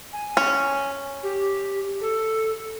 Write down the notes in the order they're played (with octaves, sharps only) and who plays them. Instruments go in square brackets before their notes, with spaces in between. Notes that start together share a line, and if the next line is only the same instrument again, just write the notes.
[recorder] G#5
[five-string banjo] C#4
[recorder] G4
A4